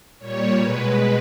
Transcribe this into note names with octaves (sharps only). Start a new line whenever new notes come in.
A#2 G3 C#5
B2 G#3 B4